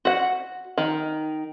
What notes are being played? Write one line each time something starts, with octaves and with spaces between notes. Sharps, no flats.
F#4 F#5
D#3